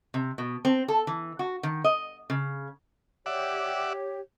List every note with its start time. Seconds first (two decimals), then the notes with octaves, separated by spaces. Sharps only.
0.14 C3
0.38 B2
0.65 C4
0.88 A4
1.07 E3
1.39 F#4
1.63 D#3
1.84 D#5
2.30 C#3
3.26 G4 C#5 D5 E5 F#5